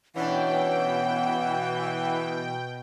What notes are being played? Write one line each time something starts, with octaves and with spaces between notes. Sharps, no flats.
B2 E3 C#4 D4 F#5 G5